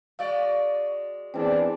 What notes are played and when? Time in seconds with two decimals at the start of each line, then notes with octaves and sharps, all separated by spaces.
0.19 G#3 F#4 D5 F5
1.34 E3 B3 C4 D4 G#4 G5